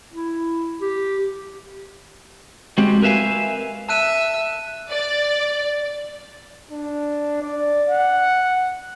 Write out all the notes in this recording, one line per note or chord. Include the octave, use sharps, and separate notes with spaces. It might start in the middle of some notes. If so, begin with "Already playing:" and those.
E4
G4
G#3 C4 F#4 G4
A#4 B4 E5 F5 G#5
E5 A5 F#6 D#7
D5
D4
D5
F#5